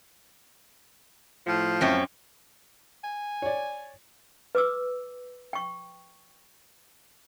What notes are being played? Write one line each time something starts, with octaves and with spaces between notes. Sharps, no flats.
A2 F3
F#2 C4 C#4
G#5
C#5 D5
B4 D6 E6
G5 C#6